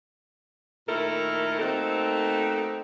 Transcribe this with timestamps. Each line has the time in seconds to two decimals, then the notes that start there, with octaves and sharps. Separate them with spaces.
0.88 A#2 D#3 A3 E4 A4 A#4
1.60 A3 A#3 C4 D#4 F#4 A4